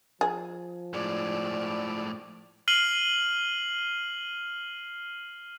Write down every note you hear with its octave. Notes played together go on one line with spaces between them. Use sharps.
F3 G#4
A2 G#3 D5
F6 C7 D#7 F#7 G7